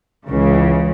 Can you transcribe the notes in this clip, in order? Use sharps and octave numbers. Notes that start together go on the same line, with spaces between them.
C#2 C#3 E3